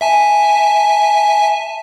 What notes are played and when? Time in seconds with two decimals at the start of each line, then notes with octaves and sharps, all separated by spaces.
0.01 E5 G#5 A5